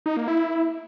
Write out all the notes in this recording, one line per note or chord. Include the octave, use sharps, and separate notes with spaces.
D#4
A#3
E4